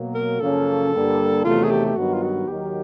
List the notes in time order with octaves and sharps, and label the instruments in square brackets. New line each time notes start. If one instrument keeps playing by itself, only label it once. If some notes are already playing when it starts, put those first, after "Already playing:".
Already playing: [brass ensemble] B2 F#3 A#3
[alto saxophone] A#4
[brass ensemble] F#2 C#3 F3 A#3 C#4 [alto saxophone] A4
[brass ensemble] G2 D3 G3 A#3
[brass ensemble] E2 C3 D#3 F#3 A3 [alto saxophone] F4
[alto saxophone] G#4
G4
G4
[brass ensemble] G2 D#3 F#3 B3 [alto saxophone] F#4
[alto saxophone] F4
F#4
[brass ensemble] D#2 D#3 F#3 [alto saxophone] G4